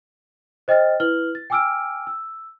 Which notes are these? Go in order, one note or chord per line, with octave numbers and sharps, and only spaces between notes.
C5 D#5 G5 F6 A6
E4 B4 F6 F#7 G7
A6
G5 G#5 D6 E6 F6 D7
E6